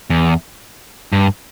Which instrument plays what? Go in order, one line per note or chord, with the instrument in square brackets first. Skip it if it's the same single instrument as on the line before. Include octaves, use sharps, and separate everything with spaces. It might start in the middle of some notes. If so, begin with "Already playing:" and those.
[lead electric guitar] E2
G2